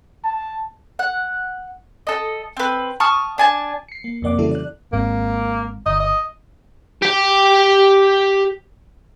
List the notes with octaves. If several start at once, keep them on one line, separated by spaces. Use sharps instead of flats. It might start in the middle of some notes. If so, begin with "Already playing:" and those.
A5
F#5
A4 D#5
C4 B4
A5 C#6 D#6 F6
D4 G#5 A5
C7 C#7
A#3
F2 C3 A#3 D5 F#5 D6
C#3 E3 F#3 G3 E4 A4
D5 F#6
G#1 G#2 A#3 C4
G1 D#5
D#5
G4 G5